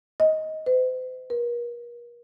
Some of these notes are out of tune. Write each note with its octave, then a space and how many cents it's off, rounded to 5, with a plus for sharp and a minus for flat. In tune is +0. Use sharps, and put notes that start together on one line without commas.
D#5 +15
C5 -45
A#4 +40